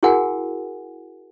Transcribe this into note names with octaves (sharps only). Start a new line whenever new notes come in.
E4 F#4 G#4 A#4 F#5 G#5